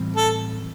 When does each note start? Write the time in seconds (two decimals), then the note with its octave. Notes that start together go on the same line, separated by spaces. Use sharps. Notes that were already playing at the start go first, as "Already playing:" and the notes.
Already playing: A2 E3 G3 C4
0.16 A4